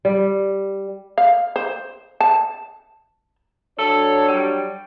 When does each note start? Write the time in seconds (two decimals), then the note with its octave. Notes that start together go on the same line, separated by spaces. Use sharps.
0.05 G3
1.18 F5
1.56 C5
2.20 A5
3.79 F#3 D4 A4 C#5
4.28 G3